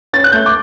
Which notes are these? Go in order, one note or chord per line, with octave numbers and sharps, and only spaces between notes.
C#4 A6
F#6
A3 G6
D6